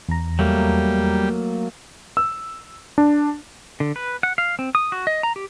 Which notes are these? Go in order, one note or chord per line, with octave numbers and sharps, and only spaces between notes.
E2 A#5
F#3 G3 A3 A#3
E6
D4
D3
B4
F#5
F5
C4
D#6
F#4
D#5
A#5
G4